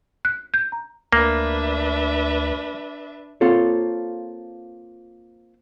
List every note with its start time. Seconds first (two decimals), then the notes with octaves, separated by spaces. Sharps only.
0.25 F#6
0.54 G6
0.72 A#5
1.13 D2 A#3 D4 B4 E5
3.41 A#3 C4 F4 A4 C#5